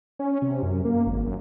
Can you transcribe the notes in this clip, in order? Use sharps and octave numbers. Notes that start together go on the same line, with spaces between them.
C#4
C3
F#2
A#3
G#1
F#2